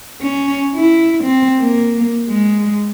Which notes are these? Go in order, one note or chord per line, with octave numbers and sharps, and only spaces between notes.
C#4
E4
C4
A#3
G#3